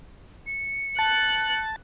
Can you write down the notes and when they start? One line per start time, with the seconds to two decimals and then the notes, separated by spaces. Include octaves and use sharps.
0.47 C#7
0.99 A5 F#6